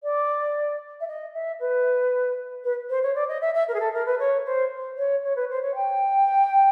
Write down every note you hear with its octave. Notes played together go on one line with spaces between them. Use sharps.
D5
E5
D#5
E5
B4
B4
C5
C#5
D5
D#5
E5
E5
A#4
G#4
A4
A#4
B4
C#5
C5
C#5
C#5
B4
C5
C#5
G5